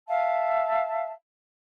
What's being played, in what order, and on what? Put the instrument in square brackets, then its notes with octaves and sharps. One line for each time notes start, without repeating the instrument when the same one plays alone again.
[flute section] E5 F5 A5